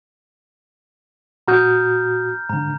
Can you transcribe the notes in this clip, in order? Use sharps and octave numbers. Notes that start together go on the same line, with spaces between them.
A#2 F#4 A#5 D#6 F6 G6
G#2 D3 A#5